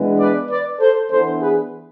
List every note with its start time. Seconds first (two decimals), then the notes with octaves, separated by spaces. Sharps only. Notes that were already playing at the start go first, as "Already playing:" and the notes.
Already playing: E3 G#3 B3 D4
0.19 B4 D5
0.49 B4 D5
0.80 A4 C5
1.10 E3 B3 D4 A4 C5
1.41 G#4 B4